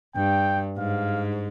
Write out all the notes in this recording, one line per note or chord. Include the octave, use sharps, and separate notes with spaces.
G2 G5
G#2 F5